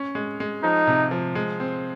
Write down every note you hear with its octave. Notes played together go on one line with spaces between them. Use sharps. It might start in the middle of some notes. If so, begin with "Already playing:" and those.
Already playing: C#4
G#3
G#3
F3 D#4
C3
F3
G#3
C4